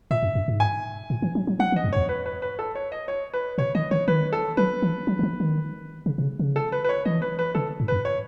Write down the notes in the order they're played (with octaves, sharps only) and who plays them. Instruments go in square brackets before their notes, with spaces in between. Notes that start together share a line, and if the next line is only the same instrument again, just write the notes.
[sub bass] A2 [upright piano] E5
[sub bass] F#2
F#2
G#2
[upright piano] G#5
[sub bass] A2
E3
F#3
F#3
[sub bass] F#3 [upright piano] F#5
[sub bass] E3
[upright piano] D#5
[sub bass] F#2
[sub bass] E2 [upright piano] C#5
[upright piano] B4
B4
B4
A4
C#5
D#5
C#5
B4
[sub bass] B2 [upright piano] C#5
[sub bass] D#3 [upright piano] D#5
[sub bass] D#3 [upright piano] C#5
[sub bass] D#3 [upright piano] B4
[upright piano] A4
[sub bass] F#3 [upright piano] B4
[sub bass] E3
F#3
D#3
E3
D#3
C#3
B2
C#3
C#3
[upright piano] A4
B4
B4
C#5
[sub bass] E3 [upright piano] D#5
[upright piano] B4
B4
[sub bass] C#3 [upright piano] A4
[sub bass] G#2
[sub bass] F#2 [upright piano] B4
[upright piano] C#5